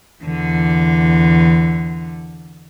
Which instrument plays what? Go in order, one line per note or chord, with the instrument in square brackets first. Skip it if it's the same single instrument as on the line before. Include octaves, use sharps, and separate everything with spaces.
[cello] E2 D3